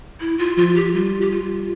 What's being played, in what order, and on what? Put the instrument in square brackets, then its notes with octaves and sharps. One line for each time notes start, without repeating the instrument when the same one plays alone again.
[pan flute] E4
F4
[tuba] F3 [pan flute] F4
[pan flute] G4
[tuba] G3 [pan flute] F4
[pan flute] G4
F4